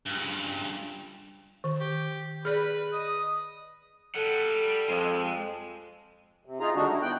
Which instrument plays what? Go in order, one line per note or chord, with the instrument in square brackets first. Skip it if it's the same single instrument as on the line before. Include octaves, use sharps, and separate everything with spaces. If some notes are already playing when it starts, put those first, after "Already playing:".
[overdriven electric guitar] C#2 G2
[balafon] D#3
[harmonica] G4
[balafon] G#4 D5 [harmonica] B4
[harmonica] D#5 D#6
[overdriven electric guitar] G3 F#5 [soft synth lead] A4
[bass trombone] F2 [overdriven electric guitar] G#3
[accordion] C3
D#4 F4 G#4 A#5
D3 G3 G#3 D4 D#4 F#4
E4
B3 G5 F#6 G6